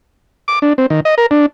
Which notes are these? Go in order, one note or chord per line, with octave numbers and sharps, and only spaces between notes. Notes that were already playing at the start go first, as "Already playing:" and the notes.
D6
D4
C4
D#3
D#5
A#4
D4